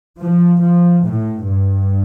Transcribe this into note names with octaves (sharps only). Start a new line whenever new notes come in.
F3
F3
A2
G2